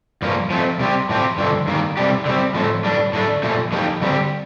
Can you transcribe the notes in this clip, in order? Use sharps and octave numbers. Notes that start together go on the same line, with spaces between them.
G2 F3 A#3
F3 A3 C4
C3 G3 C4 G4
A2 F3 C4 G4
G2 D3 F3
G2 D#3 A#3
C3 G3 D4 G4
D3
G3 C4
A2 F3 A3
A2 G3 D4
A2 A3 D4
A#2 F3 A3
A2 F3 A#3 D#4 G4
D3 G3 C4 G4